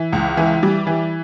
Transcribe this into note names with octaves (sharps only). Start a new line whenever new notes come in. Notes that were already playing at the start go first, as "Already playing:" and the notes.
Already playing: E3
C#2
E3
G3
E3